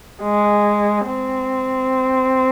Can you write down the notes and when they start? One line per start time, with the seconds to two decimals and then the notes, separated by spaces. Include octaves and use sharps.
0.23 G#3
1.06 C4